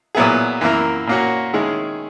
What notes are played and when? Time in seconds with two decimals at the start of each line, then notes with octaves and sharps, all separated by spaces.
0.15 A#2 F#3 B3 E4 G#4
0.61 F#2 E3 A#3 E4 A#4
1.07 A#2 A#3 C#4 F#4
1.54 D#3 G#3 C#4 E4 G#4